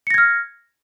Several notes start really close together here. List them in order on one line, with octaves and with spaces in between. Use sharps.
C#7 A#6 G#6 F6